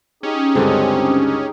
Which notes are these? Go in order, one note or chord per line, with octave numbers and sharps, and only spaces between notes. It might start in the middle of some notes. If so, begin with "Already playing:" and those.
C#4 D#4 G4 G#4
C#2 G2 D3 C4